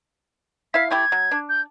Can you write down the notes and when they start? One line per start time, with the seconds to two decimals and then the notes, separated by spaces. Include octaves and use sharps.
0.74 E4 F5 B6
0.90 A3 E4 G4 G#6
1.12 F#3
1.31 D4
1.49 G6